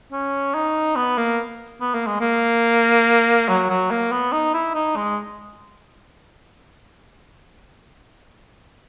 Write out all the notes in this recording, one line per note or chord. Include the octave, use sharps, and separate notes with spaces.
C#4
D#4
B3
A#3
B3
A#3
G#3
A#3
F#3
F#3
A#3
B3
D#4
E4
D#4
G#3